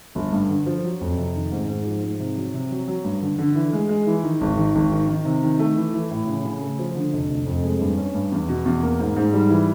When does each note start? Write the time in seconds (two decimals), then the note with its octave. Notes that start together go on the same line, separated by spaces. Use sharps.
0.15 G1
0.33 G2
0.49 D3
0.66 F3
0.84 F#3
1.01 F2
1.18 C3
1.35 D#3
1.51 G#2
1.69 G#2
1.86 F3
2.03 G#2
2.19 C3
2.37 F#3
2.54 C3
2.71 F#3
2.88 F#3
3.04 G2
3.22 D3
3.38 D3
3.55 E3
3.73 G#3
3.89 G#3
4.07 E3
4.23 D#3
4.41 G#1
4.57 D#3
4.75 G#1
4.92 D#3
5.08 D#3
5.25 C3
5.43 D#3
5.59 A3
5.76 E3
5.94 E3
6.11 A2
6.27 C#3
6.45 C#3
6.61 A3
6.79 F3
6.96 D3
7.13 F1
7.30 F1
7.46 F2
7.63 G#3
7.80 G2
7.97 C#4
8.14 G2
8.32 E2
8.48 B2
8.65 E2
8.82 A#3
8.99 G#2
9.16 G#2
9.33 G3
9.50 E3